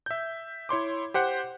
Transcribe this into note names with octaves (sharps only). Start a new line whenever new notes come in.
E5 G6
E4 C#5 C6 D6
G4 C5 F#5